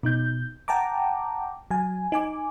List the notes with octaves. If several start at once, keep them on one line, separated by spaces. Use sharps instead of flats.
B2 D#4 G6
F#5 G5 A5 A#5 D6
F#3 G#5
D#4 G#5 D6